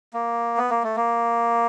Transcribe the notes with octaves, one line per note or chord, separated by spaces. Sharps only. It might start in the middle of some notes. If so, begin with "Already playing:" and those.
A#3
B3
A#3
A3
A#3